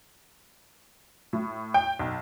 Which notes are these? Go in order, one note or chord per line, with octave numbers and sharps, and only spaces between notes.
A2
G5
B1